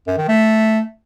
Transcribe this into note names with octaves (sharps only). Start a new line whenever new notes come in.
F#2
D#3
A3